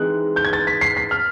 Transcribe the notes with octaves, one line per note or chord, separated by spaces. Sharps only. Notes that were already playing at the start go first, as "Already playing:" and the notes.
Already playing: E3 G#3 C4 D#4 F#6
G6
G#6
A6
B6
C7
B6
F6